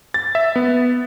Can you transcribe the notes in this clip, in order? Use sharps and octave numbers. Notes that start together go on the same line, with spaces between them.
A6
E5
B3